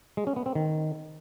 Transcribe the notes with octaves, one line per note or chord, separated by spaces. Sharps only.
G#3
C#4
B3
C4
D#3